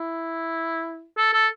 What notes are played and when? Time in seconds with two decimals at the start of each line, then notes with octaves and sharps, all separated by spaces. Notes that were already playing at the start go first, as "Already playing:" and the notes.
Already playing: E4
1.17 A4
1.33 A4